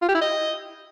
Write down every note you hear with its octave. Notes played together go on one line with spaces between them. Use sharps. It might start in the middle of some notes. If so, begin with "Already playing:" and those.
F4
G4
E4
D#5